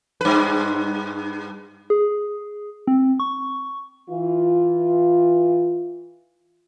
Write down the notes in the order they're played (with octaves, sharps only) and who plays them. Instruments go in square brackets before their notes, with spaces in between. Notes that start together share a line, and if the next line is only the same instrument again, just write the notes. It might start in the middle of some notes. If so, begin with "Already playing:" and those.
[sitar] G2 B4
[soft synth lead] G#4
C4
C#6
[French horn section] E3 F4